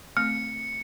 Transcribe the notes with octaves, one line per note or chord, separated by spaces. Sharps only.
A3 C4 F6 C#7